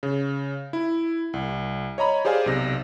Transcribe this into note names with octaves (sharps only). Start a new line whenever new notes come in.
C#3
E4
C2
C#5 D#5 A#5 B5
G4 G#4 C5 D5 F5 G#5
B1 C3 A#6